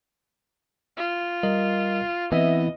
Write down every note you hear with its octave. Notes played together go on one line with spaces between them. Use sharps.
F4
G3 A#4 D#5
E3 B3 C4 D#5 E5